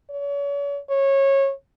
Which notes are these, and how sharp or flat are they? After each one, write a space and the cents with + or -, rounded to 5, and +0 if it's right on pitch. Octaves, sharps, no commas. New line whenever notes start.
C#5 +40
C#5 -20